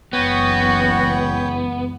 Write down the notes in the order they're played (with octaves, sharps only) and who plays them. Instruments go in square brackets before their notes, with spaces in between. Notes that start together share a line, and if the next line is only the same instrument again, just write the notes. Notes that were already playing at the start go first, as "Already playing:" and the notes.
[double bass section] F#1 C#2 E3 [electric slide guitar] B3 [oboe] F#4 [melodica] C#5 G5